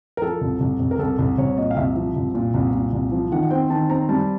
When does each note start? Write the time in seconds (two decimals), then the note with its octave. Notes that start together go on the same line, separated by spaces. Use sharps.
0.17 A#4
0.22 F3 A4
0.41 C2
0.60 C2
0.80 C2
0.91 A#4
0.99 C2 A4
1.19 C2
1.38 C2 C#5
1.57 A#2 D#5
1.71 F5
1.77 C2 E5
1.96 F3
2.16 C2
2.35 A#2
2.54 C2
2.73 A#2
2.93 C2
3.12 F3
3.32 D#3 F#5
3.43 F#5
3.51 C4 G5
3.70 D#3 A5
3.90 C4 A#5
4.09 G3 A5